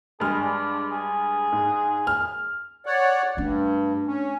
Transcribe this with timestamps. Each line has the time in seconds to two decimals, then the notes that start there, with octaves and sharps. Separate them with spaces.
0.20 G2 G#3 G#4 F6
0.41 D4
0.91 G#4
1.52 G#2
2.07 F6
2.86 C#5 D5 F#5
3.37 G2 A3 D4
4.07 C#4